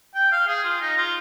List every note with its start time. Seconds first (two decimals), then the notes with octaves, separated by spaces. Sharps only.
0.15 G5
0.31 F5
0.47 G#4
0.64 F4
0.81 D#4
0.97 F4